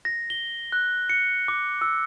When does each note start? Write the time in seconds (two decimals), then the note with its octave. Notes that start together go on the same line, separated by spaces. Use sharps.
0.05 A#6
0.30 G7
0.72 F#6
1.09 C#7
1.48 D6
1.81 E6